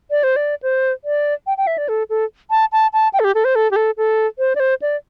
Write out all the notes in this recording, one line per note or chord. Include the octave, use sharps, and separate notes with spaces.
D5
C5
D5
C5
D5
G5
G5
E5
D5
A4
A4
A5
A5
A5
G5
A4
G4
A4
C5
A4
G4
A4
A4
C5
D5
C5
D5